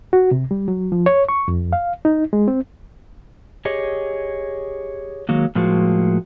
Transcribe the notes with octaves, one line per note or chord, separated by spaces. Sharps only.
F#4
C3
G3
F#3
F3
C#5
C#6
F2
F5
D#4
G#3
C4
G4 G#4 C#5 D#5
D#3 F#3 G#3 A#3
A2 F3 G#3 A#3 F4 F#4